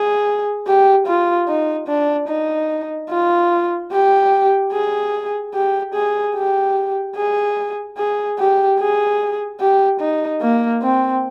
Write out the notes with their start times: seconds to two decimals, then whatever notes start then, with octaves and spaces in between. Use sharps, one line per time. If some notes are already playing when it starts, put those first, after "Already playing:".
Already playing: G#4
0.67 G4
1.07 F4
1.48 D#4
1.88 D4
2.28 D#4
3.10 F4
3.91 G4
4.72 G#4
5.54 G4
5.94 G#4
6.35 G4
7.16 G#4
7.97 G#4
8.38 G4
8.79 G#4
9.60 G4
10.00 D#4
10.42 A#3
10.82 C4